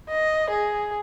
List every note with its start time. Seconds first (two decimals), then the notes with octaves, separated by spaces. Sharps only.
0.10 D#5
0.51 G#4